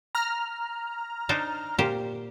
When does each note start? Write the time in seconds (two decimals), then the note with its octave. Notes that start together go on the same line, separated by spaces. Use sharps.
0.15 A#5 F6
1.29 D4 D#4 C5
1.79 A#2 G4 C5